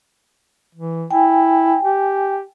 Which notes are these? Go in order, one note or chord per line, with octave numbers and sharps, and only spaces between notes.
E3
E4 G5 G#5
G4